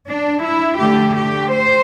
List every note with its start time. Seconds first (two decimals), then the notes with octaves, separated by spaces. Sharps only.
0.09 D4
0.44 E4
0.80 D3 A3 G4
1.16 G4
1.52 C5